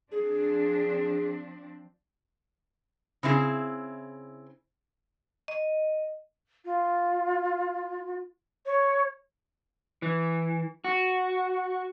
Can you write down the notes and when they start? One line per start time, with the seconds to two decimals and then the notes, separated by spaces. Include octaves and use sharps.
0.12 F3 C4 D4 G#4
3.23 C#3 C4 E4 G#4
5.48 D#5
6.65 F4
8.65 C#5
10.02 E3
10.84 F#4